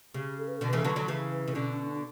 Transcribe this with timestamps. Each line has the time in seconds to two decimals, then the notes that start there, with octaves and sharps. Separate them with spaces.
0.14 C#3 G4
0.39 A4
0.48 B4
0.57 B2 D3 A4
0.68 B4
0.73 C#3 E3 A4
0.84 D3 F#3 B4
0.96 D3 F#3 A4
1.08 C#3 E3
1.31 B4
1.48 C#3
1.54 B2 D3 C#4
1.71 C#4
1.86 D4